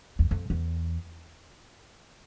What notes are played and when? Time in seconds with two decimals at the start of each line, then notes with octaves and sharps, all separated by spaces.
0.19 E2
0.31 F2
0.50 E2